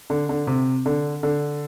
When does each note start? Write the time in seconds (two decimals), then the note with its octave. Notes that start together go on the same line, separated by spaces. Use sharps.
0.10 D3
0.29 D3
0.47 C3
0.86 D3
1.23 D3